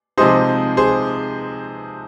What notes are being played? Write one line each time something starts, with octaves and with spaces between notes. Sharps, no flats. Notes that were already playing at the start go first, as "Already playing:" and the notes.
C3 F3 G#3 D#4 G#4 C5
G#4 C5